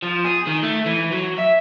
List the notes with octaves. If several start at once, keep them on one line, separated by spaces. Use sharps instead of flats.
F3
G#4
D#3
A3
E3
F#3
E5